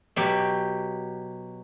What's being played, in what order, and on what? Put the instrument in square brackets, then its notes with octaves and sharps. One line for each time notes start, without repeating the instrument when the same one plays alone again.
[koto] B2 F#3 G4